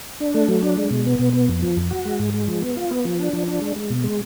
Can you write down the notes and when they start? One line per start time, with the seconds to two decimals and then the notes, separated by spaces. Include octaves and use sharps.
0.20 D4
0.34 A3
0.48 F#3
0.62 D4
0.77 G#3
0.91 B2
1.06 B3
1.19 B2
1.33 B3
1.48 F2
1.62 F3
1.77 F2
1.91 F#4
2.05 G#3
2.19 G#2
2.34 G#3
2.48 F3
2.62 B3
2.77 F4
2.91 B3
3.05 F3
3.19 D4
3.33 F3
3.47 D4
3.61 G#3
3.76 G#3
3.90 B2
4.04 G#3